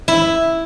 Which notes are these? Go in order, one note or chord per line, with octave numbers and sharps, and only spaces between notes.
E4